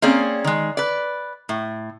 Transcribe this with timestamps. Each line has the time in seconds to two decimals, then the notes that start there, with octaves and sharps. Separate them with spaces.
0.02 A#3 C4 C#4 G#4 D5
0.44 D#3 G#3
0.77 B4 D5
1.49 A2